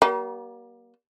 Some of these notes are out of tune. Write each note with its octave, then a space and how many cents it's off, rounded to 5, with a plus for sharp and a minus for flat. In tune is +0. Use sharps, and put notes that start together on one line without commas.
G3 -40 A#3 +30